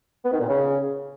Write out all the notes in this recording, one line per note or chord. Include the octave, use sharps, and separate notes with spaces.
B3
D#3
A#2
C#3